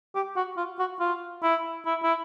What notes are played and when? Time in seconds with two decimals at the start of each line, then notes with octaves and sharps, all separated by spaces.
0.15 G4
0.36 F#4
0.57 F4
0.79 F#4
0.99 F4
1.42 E4
1.85 E4
2.03 E4